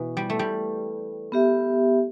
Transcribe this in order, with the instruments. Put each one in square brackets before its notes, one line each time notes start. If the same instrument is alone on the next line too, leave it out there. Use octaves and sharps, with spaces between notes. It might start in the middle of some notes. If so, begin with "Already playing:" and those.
Already playing: [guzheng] B2 E3
G3
A3
G3
[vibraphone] B3 G4 E5